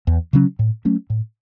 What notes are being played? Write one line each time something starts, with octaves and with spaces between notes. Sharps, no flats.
E2
C#3 F#3 C#4
A2
F#3 A3 C#4
A2